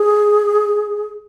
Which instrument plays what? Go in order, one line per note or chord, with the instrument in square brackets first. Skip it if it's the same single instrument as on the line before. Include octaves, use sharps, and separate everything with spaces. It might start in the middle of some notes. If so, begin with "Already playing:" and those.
Already playing: [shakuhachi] G#4